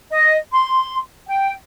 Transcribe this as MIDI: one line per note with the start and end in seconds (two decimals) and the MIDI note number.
0.11 0.37 75
0.52 0.98 84
1.27 1.52 79